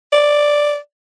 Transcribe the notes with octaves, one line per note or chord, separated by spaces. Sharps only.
D5